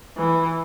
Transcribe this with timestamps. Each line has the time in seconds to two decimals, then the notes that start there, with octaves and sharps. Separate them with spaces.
0.18 E3